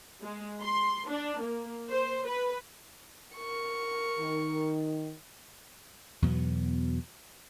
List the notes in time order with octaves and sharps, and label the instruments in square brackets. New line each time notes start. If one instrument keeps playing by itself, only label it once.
[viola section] G#3
C6
D4
A#3
C5
B4
[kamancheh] A#4 C#6
[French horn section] D#3
[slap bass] E2 B2 F#3 B3